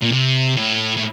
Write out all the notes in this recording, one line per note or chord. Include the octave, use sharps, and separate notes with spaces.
A#2
C3
A2
A2